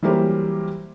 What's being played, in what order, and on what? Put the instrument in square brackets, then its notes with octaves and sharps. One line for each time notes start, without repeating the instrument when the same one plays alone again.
[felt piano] E3 F#3 G3 A#3 G4 C5